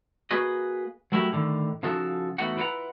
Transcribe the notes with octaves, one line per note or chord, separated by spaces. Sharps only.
A#3 F#4 G#4 B4 D#5
F#3 A3 E4 F#4 G4 A#4
A2 D3 D#3
C#3 F3 D#4 F#4 A4
E2 E3 A3 D#4 F#4 F#5
E4 F4 B4 D5 F#5 A#5